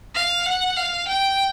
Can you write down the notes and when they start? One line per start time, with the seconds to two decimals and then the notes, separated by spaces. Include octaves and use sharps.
0.15 F5
0.46 F#5
0.77 F5
1.08 G5